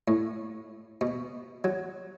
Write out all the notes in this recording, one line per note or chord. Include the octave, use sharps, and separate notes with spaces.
A2
B2
F#3